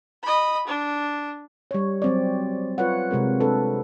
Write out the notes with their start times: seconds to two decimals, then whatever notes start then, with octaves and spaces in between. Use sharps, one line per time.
0.23 D#5 B5
0.67 D4
1.71 G3 C#5
2.02 F#3 C4 D5
2.78 F4 B4 C#5 F#5
3.11 C3 G#3 C4 A#4
3.41 D4 A4 B4